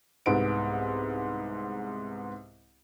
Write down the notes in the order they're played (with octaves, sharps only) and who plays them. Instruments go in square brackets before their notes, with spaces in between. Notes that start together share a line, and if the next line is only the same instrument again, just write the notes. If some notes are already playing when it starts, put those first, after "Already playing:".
[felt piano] C2 G#2 B3 D7